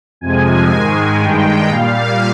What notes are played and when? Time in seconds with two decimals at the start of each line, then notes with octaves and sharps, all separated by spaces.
0.21 F2 C3 F3 G#3 G#5
0.70 G#2 D#3 G#3
1.20 G2 D#3 G#3 G5
1.69 A#2 G3 F5